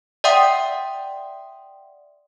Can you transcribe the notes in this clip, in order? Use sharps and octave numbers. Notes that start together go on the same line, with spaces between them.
D5 E5 F#5 G5 C6 D#6